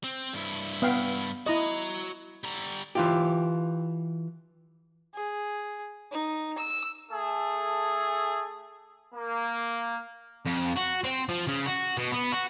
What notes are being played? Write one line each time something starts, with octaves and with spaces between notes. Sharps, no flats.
C4
G2 E4
B3 F5 G5
E4 F#4 D#5 A#5
G3 A#5
E3 F4 G4
G#4
D#4
E6
A3 G#4 A4
A#3
F2
F#4
C4
F3
C#3
F#4
B2
B3
F#4